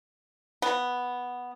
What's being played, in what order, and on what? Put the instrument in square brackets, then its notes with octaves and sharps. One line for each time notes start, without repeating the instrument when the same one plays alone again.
[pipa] B3